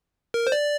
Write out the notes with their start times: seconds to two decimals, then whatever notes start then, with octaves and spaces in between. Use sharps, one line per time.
0.34 A#4
0.47 C5
0.52 D5